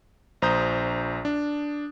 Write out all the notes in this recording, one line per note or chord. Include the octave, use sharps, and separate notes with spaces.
A#1 C5 A#5 D#6 G6
D4